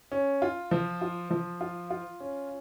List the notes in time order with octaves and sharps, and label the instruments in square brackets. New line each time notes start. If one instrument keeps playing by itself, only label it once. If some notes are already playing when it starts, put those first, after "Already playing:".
[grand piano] C#4
F4
F3
F4
F3
F4
F4
C#4